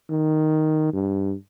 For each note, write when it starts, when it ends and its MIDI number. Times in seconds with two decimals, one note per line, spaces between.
0.10 0.92 51
0.93 1.35 43